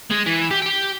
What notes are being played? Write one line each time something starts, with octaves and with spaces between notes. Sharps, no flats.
G#3 G#4
E3
G4
G4 G5